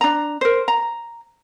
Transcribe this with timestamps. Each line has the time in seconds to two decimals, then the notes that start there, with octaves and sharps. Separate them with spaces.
0.01 D4 A#5
0.41 A#4 C5
0.68 A#5